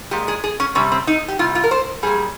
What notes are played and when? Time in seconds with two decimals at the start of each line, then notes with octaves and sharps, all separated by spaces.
0.11 A#2 G#3 G4
0.28 G#4
0.44 G#4
0.60 C#4
0.75 C3 G3 C#4
0.92 C4
1.07 D#4
1.28 G4
1.39 C3 G3 F4
1.55 F4
1.64 A#4
1.71 C5
2.03 A#2 G3 G#4